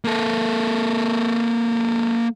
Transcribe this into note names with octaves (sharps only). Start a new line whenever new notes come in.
A#3 A4